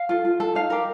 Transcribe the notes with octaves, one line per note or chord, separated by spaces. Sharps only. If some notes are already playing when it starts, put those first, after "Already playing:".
Already playing: F5
F4 A4
F4
A4
D#4 F5
G4 A#4